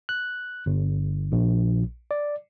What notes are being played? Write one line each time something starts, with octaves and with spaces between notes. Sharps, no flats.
F#6
G1
A#1
D5